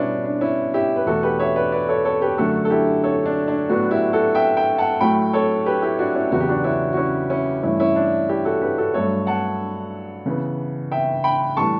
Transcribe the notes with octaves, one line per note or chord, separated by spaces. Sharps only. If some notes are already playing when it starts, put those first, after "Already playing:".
Already playing: B2 G3 B3 C#4 D4 E4
D4
C#4 E4
E4 G4
B4
E2 B2 A3 F#4 A4
G4 B4
C#5 E5
B4 D5
B4 D5
A4 C#5
A4 C#5
G4 B4
F#2 D3 F#3 A3 F#4 A4
A4
E4 G4
A4 C#5
D4
D4
A2 F#3 B3 D4 F#4
E4 G4
F#4 A4
E5 G5
E5 G5
F#5 A5
A2 F#3 A3 G5 B5
A4 C#5
G4 B4
E4 G4
D4 F#4
C#4 E4
E2 C#3 F#3 B3 F#4
G4
D4 F#4
C#4 E4
F#4
C#4 E4
C#4 E4
G2 E3 A3 C#4 E4
C#4 E4
D4
E4 G4
F#4 A4
G4 B4
F#4 A4
G2 F#3 A3 A4 C#5
F#5 A5
C#3 E3 B3
E5 G5
G5 B5
A2 E3 G3 A5 C#6